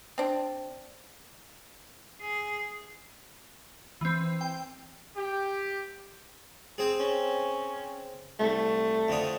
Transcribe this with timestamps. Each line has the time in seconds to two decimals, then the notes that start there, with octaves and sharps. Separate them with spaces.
0.18 C4 D4
2.21 G#4
4.01 E3 C4
4.41 G5
5.17 G4
6.78 C4 G#4
7.00 C#4
8.39 C2 A3
9.08 F2 D3 D#6